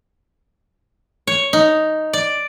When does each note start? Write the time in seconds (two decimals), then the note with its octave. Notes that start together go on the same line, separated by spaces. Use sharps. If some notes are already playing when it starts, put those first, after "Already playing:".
1.27 C#5
1.53 D#4
2.13 D5